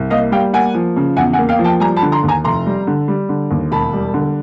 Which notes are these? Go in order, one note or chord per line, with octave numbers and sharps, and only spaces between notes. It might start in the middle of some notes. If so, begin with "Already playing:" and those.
Already playing: C2
A#3 D#5 F5
G3 F5 G5
A#3 F#5 G#5
F3
C#3
E2 F#5 G#5
F#5 G#5
A#3
F5 G5
F3
G5 A5
G3 G#5 A#5
A5 B5
D3
A#5 C6
D#2
G#5 A#5
F1 A#5 C6
G3
D3
G3
D3
D#2
E1 A5 B5
G3
D3